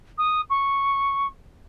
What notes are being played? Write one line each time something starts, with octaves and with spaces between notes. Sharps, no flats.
D#6
C#6